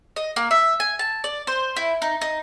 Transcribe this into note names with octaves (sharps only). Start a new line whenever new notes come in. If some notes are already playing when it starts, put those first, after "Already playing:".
D#5
A#3
E5
G#5
A5
D5
C5
E4
D#4
D#4